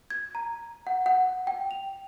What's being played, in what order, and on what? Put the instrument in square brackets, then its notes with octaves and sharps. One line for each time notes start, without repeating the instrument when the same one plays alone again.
[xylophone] G#6
A#5
F#5
F#5
G5
F7